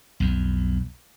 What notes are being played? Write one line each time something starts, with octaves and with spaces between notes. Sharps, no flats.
B1 F2